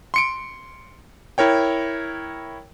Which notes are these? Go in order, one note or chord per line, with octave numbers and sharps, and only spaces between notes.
C6 C#7 D7
E4 A#4 C#5 G5